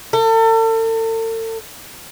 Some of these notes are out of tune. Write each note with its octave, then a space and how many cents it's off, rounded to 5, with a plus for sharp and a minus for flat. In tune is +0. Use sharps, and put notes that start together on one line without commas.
A4 +40